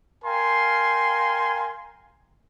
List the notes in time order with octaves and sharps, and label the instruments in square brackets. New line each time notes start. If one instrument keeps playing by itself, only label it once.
[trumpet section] A#4 F5 G5 G#5 C6